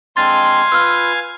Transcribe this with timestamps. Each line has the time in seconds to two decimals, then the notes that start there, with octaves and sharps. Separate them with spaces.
0.17 G#3 C4 D4 F5 G#5 C6 A6
0.72 F4 B4 E6 F6